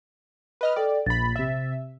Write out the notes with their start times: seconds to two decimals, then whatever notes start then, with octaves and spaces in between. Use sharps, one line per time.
0.61 B4 D#5 F6
0.76 A4 D5 G5
1.06 A#1 B5 A6
1.36 C3 E5